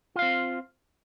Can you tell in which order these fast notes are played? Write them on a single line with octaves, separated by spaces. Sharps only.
F4 F5 C4